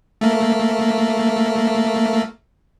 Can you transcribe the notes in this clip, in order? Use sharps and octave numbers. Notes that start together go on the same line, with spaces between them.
A3 A#3